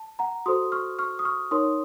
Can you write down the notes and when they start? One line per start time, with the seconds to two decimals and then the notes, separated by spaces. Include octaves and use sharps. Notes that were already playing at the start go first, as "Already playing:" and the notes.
Already playing: A5
0.19 F#5 A#5
0.46 F#4 A4 C5 C6 D#6
0.72 C#6 F6
0.99 C#6 F6
1.19 D#6
1.25 C#6 F6
1.51 D#4 A#4 C#5 C6 D#6